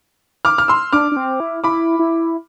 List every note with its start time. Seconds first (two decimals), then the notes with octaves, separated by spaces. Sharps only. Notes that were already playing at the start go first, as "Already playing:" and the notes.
0.45 D6 F6
0.58 F6
0.68 C6 E6
0.93 D4 D6 F6
1.12 D4
1.16 C4
1.40 E4
1.64 E4 B5 D6
1.99 E4